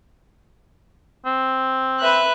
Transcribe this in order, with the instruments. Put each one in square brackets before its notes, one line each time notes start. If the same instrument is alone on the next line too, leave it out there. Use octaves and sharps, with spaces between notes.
[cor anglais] C4
[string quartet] B4 E5 F#6